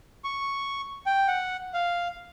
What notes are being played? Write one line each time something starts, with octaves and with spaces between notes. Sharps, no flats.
C#6
G5
F#5
F5